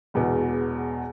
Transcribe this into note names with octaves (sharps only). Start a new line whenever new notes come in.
E1 E2 B2